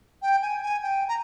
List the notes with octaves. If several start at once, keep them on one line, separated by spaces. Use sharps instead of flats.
G5
G#5
G#5
G5
A#5